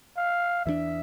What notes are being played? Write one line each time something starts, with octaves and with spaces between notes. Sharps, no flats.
F5
E2 E3 A#3 D4 E5